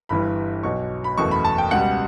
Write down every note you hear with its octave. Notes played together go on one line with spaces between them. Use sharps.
G1 G2 E3 G3 B5
B1 B2 F#3 C#6
B5
F#1 E2 B2 A3 C#6
B5
A5
G5
C#2 B2 G3 F#5